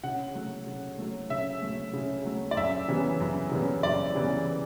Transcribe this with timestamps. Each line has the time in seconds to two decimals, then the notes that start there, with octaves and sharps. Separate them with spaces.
0.03 C#3 F#5
0.35 F#3 A3
0.67 C#3
0.99 F#3 A3
1.30 C#3 E5
1.62 F#3 A3
1.93 C#3
2.25 F#3 A3
2.51 D5
2.56 F#2 E5
2.88 C#3 E3 G3 B3
3.20 F#2
3.51 C#3 E3 G3 B3
3.83 F#2 D5
4.15 C#3 E3 G3 B3